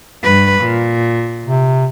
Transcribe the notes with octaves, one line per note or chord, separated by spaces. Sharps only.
G2 B4
A#2
C3